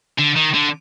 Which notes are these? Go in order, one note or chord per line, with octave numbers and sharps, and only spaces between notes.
D3
D#3
D3